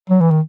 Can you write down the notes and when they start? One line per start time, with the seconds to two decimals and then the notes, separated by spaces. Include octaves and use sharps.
0.10 F#3
0.21 E3
0.31 D#3